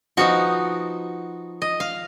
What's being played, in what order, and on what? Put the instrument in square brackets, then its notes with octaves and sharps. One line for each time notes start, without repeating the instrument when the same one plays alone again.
[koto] F3 B3 D#4 F#4
D#5
F5